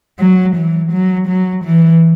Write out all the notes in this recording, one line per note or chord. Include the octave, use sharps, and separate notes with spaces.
F#3
E3
F#3
F#3
E3